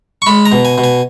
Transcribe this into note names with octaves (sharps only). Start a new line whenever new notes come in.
C#6
G#3 B5
A#5
B2
G#5
B2
G#5